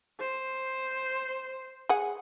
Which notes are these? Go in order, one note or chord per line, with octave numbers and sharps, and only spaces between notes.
C5
G#4 F#5